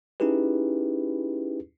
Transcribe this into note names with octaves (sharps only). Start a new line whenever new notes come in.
C#4 D#4 E4 G4 G#4 B4